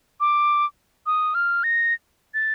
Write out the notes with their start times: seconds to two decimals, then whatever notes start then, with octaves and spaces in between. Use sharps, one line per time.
0.20 D6
1.06 D#6
1.34 F6
1.64 A#6
2.34 A6